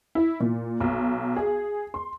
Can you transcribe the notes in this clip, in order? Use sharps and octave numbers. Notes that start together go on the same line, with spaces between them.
E4
A#2
B1
G#4
C6